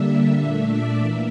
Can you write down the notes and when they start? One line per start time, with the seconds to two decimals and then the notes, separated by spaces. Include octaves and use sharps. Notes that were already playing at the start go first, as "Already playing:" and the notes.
Already playing: D3 G3 A#3 D4 E5
0.12 E5
0.41 A#2 A3 D4
0.70 D5
0.99 E3 A#3 E5